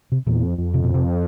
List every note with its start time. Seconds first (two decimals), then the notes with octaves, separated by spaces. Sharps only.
0.12 C3
0.27 E2 A#2
0.43 F2
0.58 F2
0.74 C3
0.84 B2
0.94 C3